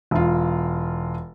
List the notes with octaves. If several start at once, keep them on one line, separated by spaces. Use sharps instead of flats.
E1 F4